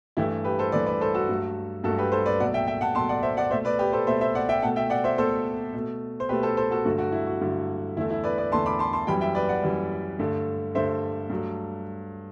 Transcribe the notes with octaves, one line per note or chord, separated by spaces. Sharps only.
G2 E3 A3 E4 G4
G4 B4
A4 C5
G2 E3 A3 B4 D5
B4 D5
A4 C5
F#4 A4
G2 F#3 A3
G2 F#3 A3 F#4 A4
G4 B4
A4 C5
B4 D5
B2 F#3 A3 D5 F#5
E5 G5
E5 G5
F#5 A5
B2 F#3 A3 A5 C6
D5 F#5
C5 E5
D5 F#5
B2 A3 C5 E5
B4 D5
G4 B4
A4 C5
B2 A3 C5 E5
C5 E5
D5 F#5
E5 G5
B2 A3 F#5 A5
E5 G5
D5 F#5
C5 E5
B2 A3 A4 C5
B2 A3
C5
B2 A3 G4 B4
A4 C5
A4 C5
F#4 A4
G2 D3 F#3 A3 F#4
F#4
E4
F#4
G2 D3 F#3 A3
E2 D3 A3 E4
E4
B4 D5
B4 D5
E2 D3 A3 A5 C6
B5 D6
A5 C6
A5 C6
F#2 E3 G3 G5 B5
E5 G5
B4 D5
D5 F#5
F#2 E3 G3
G2 D3 A3
G2 D3 A3 C5 E5
G2 F#3 A3